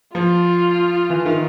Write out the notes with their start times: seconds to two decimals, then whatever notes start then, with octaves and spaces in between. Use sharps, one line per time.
0.15 F3 F4
1.10 E3
1.25 D#3